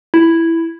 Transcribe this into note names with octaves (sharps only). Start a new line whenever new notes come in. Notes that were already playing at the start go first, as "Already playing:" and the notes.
E4